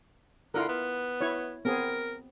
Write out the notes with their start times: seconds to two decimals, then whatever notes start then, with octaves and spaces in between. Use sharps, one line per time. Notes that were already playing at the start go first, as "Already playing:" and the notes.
0.54 D3 E4 F4 A#4
0.69 B3
1.21 E4 C#5
1.65 B3 C4 G#4 A#4